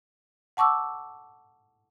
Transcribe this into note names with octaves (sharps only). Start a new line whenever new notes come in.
F#5 A5 C#6 D6 E6